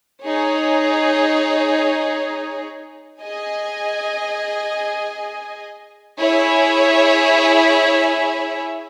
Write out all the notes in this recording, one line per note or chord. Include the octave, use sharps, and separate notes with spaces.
D#4 G#4 C#5
G#4 D#5 G#5
E4 G#4 C#5 E5 G#5